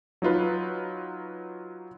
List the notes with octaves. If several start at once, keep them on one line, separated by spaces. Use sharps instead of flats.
F#3 D#4 F4 B4